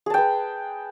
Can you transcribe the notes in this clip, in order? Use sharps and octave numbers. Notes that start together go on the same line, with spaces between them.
G#4 B4 G5 A5